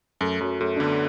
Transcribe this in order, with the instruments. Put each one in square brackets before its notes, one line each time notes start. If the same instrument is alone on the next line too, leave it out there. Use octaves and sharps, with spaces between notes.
[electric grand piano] F#2 [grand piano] A3
[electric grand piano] F#2 [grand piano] F#3
[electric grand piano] F#2 [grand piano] A3
[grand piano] D4
[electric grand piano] D3 [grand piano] B3